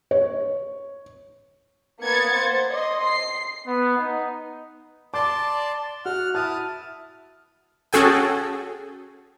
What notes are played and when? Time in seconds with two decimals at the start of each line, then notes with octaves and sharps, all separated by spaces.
0.11 C#5
2.02 A#3 B3 G#6 A6 C#7
2.37 C5
2.75 D#5 C6
3.05 C7
3.67 B3
3.97 D#4
5.14 D5 A5 C6 D6
6.05 F#4 F#5 F6
6.35 E4 A5 D#6 F6
7.93 C#4 F#4 G#4 A4 G5 G#5